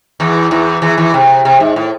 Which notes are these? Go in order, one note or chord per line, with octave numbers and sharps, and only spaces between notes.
E2 E3
E2 E3
E2 E3
E2 E3
C3
C3
G#2
A2